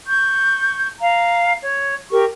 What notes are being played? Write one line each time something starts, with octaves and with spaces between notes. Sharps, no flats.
C#6 G6
F5 A#5
C#5
G4 A#4 C#6